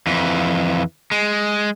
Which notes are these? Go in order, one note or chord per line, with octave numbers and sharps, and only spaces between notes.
F2 E3
G#3